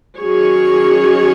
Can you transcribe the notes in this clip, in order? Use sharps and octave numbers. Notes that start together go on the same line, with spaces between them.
D#3 F#3 C#4 G#4 C#5